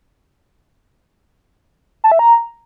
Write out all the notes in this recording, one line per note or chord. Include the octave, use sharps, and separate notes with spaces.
A5
E5
A#5